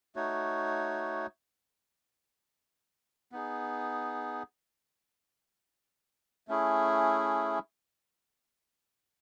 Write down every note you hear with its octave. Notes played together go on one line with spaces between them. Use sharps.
A3 D#4 F#4 C#5
B3 D#4 G#4
A3 C#4 E4 G#4